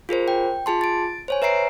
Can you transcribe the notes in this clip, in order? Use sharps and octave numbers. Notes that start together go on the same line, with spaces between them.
F4 G#4 A#4 C5
G5
F4 G#4 A5 C6
A6 D7
C5 C#5 G#5
B4 E5 A#5 C7 D7